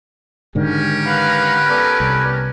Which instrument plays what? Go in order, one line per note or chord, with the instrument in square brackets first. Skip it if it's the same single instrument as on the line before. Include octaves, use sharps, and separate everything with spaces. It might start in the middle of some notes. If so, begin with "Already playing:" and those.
[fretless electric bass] G#2 D3 D#3 [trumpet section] C#4 G4 A#4
[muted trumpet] B4 [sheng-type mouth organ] F5 F#5
[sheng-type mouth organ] B3 A4 D5
[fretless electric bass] C2